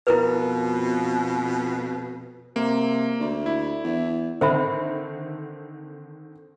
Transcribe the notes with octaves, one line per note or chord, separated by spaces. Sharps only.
F2 B2 E4 A#4 B4
C3 A#3
D2
E4
E2
D3 D#3 C4 C5 E5 B5